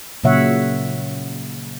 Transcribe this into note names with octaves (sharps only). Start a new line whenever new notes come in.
A#2 C#3 F#3 C#5 E5 F#5